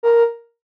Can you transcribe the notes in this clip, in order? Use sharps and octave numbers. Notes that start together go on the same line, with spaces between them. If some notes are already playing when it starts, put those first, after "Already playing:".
A#4